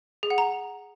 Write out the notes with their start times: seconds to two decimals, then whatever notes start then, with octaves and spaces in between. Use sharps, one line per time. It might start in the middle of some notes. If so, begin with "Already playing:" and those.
0.23 G#4
0.30 F#5
0.38 A#5